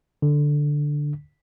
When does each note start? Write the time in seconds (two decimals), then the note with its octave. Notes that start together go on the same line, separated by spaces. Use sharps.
0.22 D3